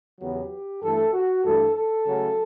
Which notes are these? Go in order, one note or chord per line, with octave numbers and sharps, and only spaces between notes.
E2 C#3 F#3 B3 G4
G2 E3 A3 A4
F#4
G2 E3 A3 A4
A4
C#3 F#3 A3